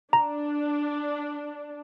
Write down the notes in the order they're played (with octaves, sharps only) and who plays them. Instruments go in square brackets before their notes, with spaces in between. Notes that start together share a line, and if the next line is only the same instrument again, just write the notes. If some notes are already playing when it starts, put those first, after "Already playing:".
[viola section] D4 [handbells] A#5